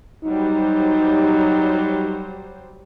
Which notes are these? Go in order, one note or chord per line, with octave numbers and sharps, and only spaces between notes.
F#3 G3 D#4 C5